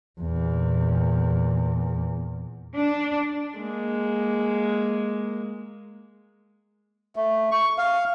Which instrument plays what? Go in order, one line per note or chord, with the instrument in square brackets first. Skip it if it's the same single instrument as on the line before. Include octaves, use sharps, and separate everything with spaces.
[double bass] E2 A#2
[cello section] D4
[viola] G#3 A#3
[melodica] A3
C#6
F5